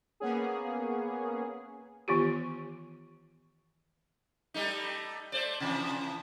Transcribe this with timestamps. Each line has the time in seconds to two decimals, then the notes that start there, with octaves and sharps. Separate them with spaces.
0.20 A#3 B3 C#4 G#4
2.08 D#3 E3 B3 F4 G4
4.54 G3 A3 D#4
5.32 A3 C5 D5
5.60 C3 E3 F3